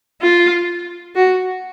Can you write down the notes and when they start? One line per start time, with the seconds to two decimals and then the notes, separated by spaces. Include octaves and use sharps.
0.22 F4
1.16 F#4